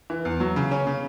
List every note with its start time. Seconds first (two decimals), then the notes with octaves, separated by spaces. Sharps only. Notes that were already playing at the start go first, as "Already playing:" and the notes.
0.10 E3
0.25 E2
0.40 F#3
0.56 C#3
0.71 C#4
0.87 C#3